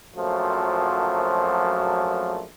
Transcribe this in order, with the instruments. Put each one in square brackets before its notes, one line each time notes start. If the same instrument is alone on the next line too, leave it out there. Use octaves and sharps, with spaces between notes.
[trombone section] A#1 F#2 F3 F#3 A3 C5